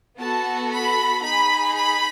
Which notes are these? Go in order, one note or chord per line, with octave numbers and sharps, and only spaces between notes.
B3 F#4 A4 A5
B5
D#4 G#4 B5
B5